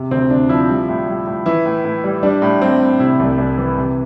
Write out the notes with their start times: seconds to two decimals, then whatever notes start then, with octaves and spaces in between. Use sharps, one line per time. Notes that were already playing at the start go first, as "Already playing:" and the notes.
Already playing: C3
0.11 D2 C4
0.30 D2 D4
0.49 F3 E4
0.69 G3
0.89 A2
1.08 G3
1.26 A2
1.46 E3 E4
1.65 A2
1.84 A2
2.04 G3
2.23 G3 D4
2.42 A2
2.62 G3 C4
2.81 A2
3.00 C3 E4
3.20 C2
3.38 C2
3.58 E3
3.78 C3